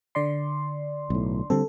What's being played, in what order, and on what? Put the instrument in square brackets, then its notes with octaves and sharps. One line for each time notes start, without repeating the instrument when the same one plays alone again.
[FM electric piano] D3 D5 C6
[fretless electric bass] B1 A2
[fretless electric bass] D3 G3 C4 [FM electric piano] A4